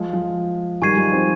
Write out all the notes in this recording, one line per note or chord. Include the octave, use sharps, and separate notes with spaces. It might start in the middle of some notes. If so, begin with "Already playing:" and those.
Already playing: F3 G#3
F3
D#3 G3 G#5 C#6 G#6 C7 D#7
F3 G#3
C4 D#4